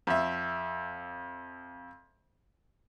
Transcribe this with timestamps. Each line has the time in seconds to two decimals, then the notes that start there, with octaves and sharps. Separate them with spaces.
0.07 F2 E5